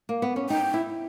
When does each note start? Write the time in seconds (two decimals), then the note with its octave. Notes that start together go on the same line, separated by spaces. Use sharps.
0.09 A#3
0.22 B3
0.36 C#4
0.49 D#4 G5
0.74 E4